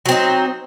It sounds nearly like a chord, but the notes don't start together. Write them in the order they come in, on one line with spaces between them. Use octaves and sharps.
F#3 C4 D#4